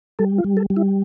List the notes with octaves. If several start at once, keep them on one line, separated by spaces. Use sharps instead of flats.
G3 A4
F4
G3
A4
G3
E4